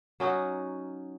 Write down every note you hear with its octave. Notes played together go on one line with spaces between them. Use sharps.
F#3 C#4 D#4 F#4